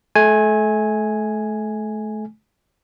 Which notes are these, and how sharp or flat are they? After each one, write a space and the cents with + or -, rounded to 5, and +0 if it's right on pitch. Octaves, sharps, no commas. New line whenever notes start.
A3 -35 G#5 +0